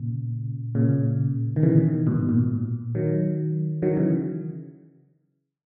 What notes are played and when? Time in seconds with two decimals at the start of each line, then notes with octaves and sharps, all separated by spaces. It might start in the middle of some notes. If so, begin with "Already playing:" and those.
Already playing: A#2 C#3
0.75 A#2 C#3
1.56 D#3
1.63 C#3 E3
1.78 B2 D#3
2.07 G#2 B2
2.29 A#2
2.95 D#3 F#3
3.82 D#3 F#3
3.97 C#3 E3